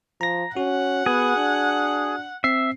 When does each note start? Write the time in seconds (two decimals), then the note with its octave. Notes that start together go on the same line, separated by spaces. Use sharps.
0.21 F3 A#5 A#6
0.57 C#4 F#4 F#5
1.06 B3 G#4
1.37 D4
2.44 C4 E5 C7